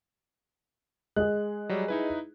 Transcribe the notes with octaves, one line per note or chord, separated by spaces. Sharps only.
G#3 G#4 F#6
F#3 G3
D#4 E4 B4